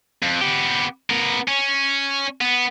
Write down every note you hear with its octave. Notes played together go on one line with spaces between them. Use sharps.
F2
B3 G4
B3 A#4
C#4
B3